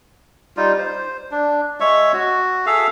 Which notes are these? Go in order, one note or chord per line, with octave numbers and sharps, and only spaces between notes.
G3 D#4 F4
C5
D4
G#3 C#5 E5 C#6
F#4
G#4 A4 E5 F5